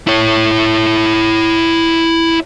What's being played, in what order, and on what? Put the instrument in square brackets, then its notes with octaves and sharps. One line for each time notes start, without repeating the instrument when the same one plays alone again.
[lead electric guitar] E4 C#5